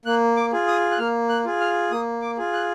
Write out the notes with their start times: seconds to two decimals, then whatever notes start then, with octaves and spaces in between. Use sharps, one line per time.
0.05 A#3 F#6
0.37 D6
0.52 F4 G#4
0.68 D#6
0.91 F#6
0.98 A#3 F6
1.29 F#6
1.45 F4 G#4
1.61 F6
1.91 A#3 D#6
2.22 D6
2.38 F4 G#4
2.53 F#6